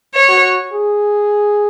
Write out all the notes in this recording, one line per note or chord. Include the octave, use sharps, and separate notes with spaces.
C#5
F#4
G#4